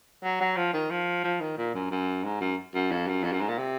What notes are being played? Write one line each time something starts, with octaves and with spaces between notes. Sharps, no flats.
F#3
F#3
F3
D#3
F3
F3
D#3
A#2
F#2
F#2
G#2
F#2
F#2
F2
F#2
F2
F#2
G#2
A#2
C3